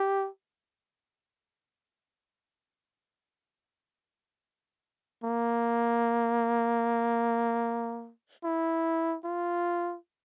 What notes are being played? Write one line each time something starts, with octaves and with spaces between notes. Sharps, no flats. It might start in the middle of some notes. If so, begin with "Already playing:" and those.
Already playing: G4
A#3
E4
F4